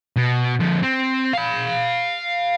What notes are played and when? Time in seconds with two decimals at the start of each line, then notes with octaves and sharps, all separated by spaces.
0.17 B2
0.60 D3 F3
0.83 C4
1.33 F5 B5